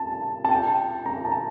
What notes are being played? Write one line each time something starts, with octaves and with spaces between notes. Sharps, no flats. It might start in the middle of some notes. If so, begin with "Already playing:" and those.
Already playing: A5
A5
G5
A#5
A5